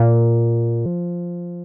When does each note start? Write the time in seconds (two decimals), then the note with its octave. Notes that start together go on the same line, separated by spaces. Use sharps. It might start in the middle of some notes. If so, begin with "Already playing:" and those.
Already playing: A#2
0.86 F3